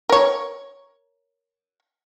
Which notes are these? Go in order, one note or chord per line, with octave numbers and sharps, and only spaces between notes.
A#4 C#5